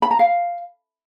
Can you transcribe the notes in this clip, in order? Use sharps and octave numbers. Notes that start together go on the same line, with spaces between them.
B5
A#5
F5